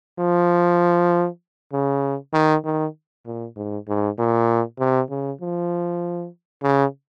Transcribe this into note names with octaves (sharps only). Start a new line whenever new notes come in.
F3
C#3
D#3
D#3
A#2
G#2
G#2
A#2
C3
C#3
F3
C#3